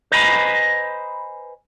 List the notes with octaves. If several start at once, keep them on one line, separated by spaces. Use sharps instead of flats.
B4 C5 D#5 G#5 A#5 B5